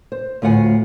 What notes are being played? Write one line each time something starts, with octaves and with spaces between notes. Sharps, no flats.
C5
D2 A2 F4 F#5 G#5